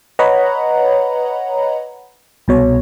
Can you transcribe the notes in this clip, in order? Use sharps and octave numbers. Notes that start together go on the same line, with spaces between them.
B4 C#5 D#5 F#5 A#5 B5
C2 B2 C#5